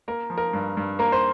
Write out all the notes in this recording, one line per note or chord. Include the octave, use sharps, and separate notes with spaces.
A#3 A#4
F3
A#4
G2
G2
A#3 A#4
C5